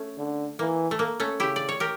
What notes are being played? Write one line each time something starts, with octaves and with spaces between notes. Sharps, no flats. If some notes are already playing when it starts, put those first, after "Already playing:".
Already playing: A3 C#4
D3
E3 A#3
A3
A#3
A3 C#4
C#3 E4 G4
D5
C#5
G4 A#4